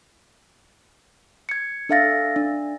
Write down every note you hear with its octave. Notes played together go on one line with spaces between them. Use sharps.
G#6 C#7
D4 A4 E5 F5 A6 A#6
D4